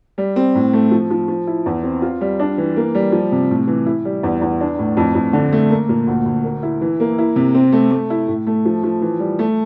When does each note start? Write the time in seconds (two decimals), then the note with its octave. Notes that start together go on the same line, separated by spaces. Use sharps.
0.18 G3
0.36 C4
0.55 A2
0.73 A3
0.91 F3
1.11 F3
1.28 F3
1.47 E4
1.66 E2
1.83 C4
2.02 F4
2.21 G3
2.39 D4
2.58 E3
2.76 A#3
2.95 G3
3.12 F3
3.32 C3
3.50 A2
3.67 E3
3.86 E4
4.05 G3
4.23 E2
4.42 E2
4.60 D4
4.79 A2
4.97 F2
5.15 F2
5.33 D3
5.52 A3
5.70 A#3
5.89 A#2
6.07 D2
6.26 D2
6.44 A#3
6.63 E4
6.81 E3
7.00 A#3
7.18 E4
7.36 C3
7.55 C4
7.72 A3
7.91 A3
8.10 E4
8.28 A2
8.47 A3
8.65 F3
8.83 F3
9.01 E3
9.20 G3
9.39 A3